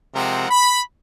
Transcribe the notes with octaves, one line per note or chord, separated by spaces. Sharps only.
C3 F3 G#3 C4 A#4 F#5
B5